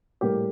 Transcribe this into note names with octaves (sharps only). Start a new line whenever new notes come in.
A#1 A2 G3 A#3 G4